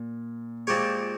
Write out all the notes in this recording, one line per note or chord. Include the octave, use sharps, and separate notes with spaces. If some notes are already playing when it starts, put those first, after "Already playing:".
Already playing: A#2
A#2 F3 G#3 C4 G4 C#5